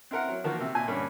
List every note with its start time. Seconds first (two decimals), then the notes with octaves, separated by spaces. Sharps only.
0.11 C4 E4 A#4 F#5
0.29 F#3
0.44 D#3 F3 A#3 F#4
0.60 C3 E6
0.75 A#2 G#5
0.88 G2 D3 A#3 C#4